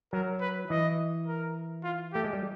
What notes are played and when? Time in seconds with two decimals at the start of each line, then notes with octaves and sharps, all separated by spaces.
0.13 F#3 A#4
0.41 B4
0.70 E3 D#5
1.27 A#4
1.84 F4
2.13 A3 G4
2.24 G#3
2.33 G3